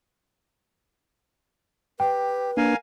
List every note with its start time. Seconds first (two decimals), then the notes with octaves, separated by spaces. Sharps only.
2.00 G4 B4 G5
2.57 A#3 D4 A#4 F5 G#5